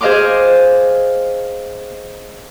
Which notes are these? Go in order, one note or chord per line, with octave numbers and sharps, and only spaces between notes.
G#4 C5 D#5 F5 C6 D6